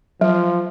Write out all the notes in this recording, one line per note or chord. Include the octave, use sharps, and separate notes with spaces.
F3 F#3